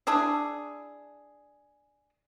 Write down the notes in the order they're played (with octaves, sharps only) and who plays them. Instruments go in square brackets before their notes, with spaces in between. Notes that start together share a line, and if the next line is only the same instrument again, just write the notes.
[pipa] D4 E4 G#4